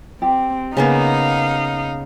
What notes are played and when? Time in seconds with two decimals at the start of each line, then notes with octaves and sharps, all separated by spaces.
0.22 C4 G4
0.77 C#3 A#3 B3 D#4 G#4 F5